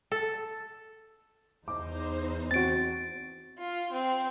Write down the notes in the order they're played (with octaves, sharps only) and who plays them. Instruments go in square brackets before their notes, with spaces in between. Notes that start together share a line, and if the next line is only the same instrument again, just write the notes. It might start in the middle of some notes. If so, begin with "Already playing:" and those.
[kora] A4
[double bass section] E2 [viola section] D#4 C5 [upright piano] D6
[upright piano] C4 F#4 [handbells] A6 D7
[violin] F4
C4